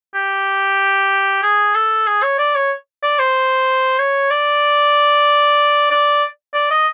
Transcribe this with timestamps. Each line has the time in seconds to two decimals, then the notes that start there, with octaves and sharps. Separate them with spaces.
0.15 G4
1.43 G#4
1.75 A4
2.07 G#4
2.23 C#5
2.39 D5
2.56 C#5
3.03 D5
3.19 C5
3.99 C#5
4.31 D5
5.91 D5
6.54 D5
6.71 D#5